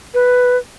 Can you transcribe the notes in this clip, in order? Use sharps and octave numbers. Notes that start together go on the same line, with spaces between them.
B4